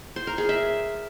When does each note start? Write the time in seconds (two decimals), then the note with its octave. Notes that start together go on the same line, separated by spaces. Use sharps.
0.16 C5
0.27 A#4
0.38 G#4
0.49 E5